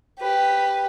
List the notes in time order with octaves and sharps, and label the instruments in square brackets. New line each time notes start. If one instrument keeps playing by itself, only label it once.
[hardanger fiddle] G4 B4